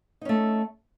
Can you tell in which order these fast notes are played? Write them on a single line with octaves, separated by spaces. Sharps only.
D#4 C#4 A3